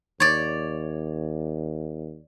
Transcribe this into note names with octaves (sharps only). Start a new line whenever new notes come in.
D#2 C#5 D5